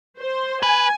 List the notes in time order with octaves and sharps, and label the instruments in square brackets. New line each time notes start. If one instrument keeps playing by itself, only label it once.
[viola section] C5
[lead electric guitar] B4 [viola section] G#5